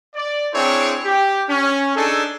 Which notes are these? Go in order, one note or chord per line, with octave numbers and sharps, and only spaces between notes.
D5
C4 D4 E4 G#4 C5 C#5
G4
C#4
D4 D#4 G#4 A4